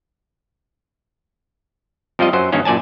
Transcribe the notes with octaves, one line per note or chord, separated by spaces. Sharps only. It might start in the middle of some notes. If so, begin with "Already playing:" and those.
F2 F3 G3 F4 D#5
F#2 F#3 C5
G2 D#3 A#3 C#4
F#2 A#2 D5 G#5 A5